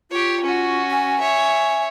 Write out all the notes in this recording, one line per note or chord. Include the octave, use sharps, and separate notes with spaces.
F4 G4 C#5
C#4 F#4
G#5
C#5 E5